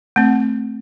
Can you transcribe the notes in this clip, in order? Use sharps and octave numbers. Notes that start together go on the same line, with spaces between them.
A3 C4